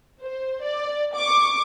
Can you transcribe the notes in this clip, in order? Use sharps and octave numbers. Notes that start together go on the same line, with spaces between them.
C5
D5
C#6 D6